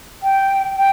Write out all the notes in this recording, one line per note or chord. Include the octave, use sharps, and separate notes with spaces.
G5
G5